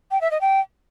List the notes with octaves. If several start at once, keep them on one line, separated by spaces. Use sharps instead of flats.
G5
E5
D#5
G5